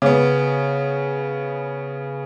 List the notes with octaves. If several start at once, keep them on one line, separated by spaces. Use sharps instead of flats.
C#3 B3